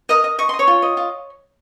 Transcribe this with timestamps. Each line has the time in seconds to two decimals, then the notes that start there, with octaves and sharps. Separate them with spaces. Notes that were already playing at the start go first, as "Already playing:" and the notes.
0.09 A#4 D#5 D#6
0.24 D#5
0.38 D#5 C#6
0.49 D#5 C6
0.59 C#5 C#6
0.67 F4
0.82 D#5
0.97 F4